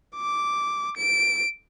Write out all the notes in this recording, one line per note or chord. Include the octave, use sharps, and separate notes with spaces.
D6
D7